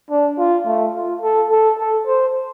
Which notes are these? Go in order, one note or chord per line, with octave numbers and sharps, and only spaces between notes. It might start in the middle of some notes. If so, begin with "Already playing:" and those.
D4
F4
A3
F4
A4
A4
A4
C5